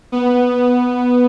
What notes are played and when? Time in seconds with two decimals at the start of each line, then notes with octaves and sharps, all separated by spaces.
0.12 B3